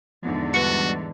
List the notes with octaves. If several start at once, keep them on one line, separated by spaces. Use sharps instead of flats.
E2 G#2 D3 F3 B3 D#4
G3 B3 F#4 B4 C#7